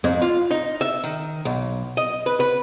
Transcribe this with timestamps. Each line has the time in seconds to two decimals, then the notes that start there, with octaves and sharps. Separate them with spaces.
0.04 F2
0.22 F4
0.51 D#4
0.81 E5
1.03 D#3
1.45 B1
1.97 D#5
2.26 B4
2.40 B4